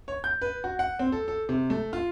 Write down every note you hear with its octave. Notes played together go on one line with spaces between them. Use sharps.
C#5
G6
B4
F#4
F#5
C4
A4
A4
C3
A3
F4